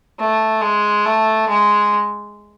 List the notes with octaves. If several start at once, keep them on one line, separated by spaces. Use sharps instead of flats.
A3
G#3
A3
G#3